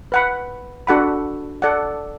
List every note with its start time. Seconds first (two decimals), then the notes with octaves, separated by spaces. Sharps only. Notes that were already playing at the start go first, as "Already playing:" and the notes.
0.12 B4 F#5 B5
0.87 D4 F#4 A4 F#5 B5
1.62 A4 D5 F#5